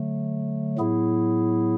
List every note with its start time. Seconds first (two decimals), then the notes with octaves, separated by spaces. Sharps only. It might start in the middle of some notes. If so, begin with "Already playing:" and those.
Already playing: D3 F#3 A3
0.78 A2 F#3 B3 E4 G#4